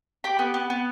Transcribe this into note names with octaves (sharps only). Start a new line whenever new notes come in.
G4 G5 B5
B3
B3
B3